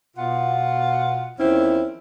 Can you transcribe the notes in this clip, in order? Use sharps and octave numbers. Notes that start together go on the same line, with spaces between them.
B2 F4 F#5
E2 D#3 F3 C4 C#4 E4